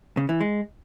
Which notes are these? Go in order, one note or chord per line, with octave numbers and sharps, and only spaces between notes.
C#3
E3
G#3